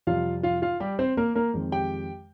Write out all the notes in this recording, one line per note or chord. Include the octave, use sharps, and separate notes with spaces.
F2 C3 G3 F4 F5
F4 F5
F4 F5
G3 G4
C4 C5
A#3 A#4
A#3 A#4
F2 D#3 G#3 C4
G4 G5